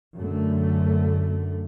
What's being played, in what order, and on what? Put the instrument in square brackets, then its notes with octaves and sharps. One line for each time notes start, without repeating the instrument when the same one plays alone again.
[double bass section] F#2 D3 A3